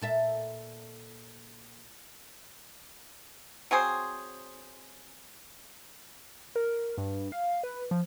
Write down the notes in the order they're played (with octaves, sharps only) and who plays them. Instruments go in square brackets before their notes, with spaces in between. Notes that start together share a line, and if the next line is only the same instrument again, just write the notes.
[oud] A#2 A4 E5
[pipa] F#3 C4 G#4 C5
[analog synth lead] A#4
G2
F5
B4
F3